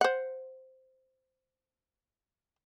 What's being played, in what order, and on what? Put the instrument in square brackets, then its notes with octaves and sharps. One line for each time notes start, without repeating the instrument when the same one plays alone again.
[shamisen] C5 F#5